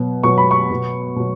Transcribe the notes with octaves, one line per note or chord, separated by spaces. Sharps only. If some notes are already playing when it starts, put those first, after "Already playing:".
Already playing: B2 F#3 B3
B2 F#3 B3 C#6
B5
C#6
B2 F#3 B3
B2 F#3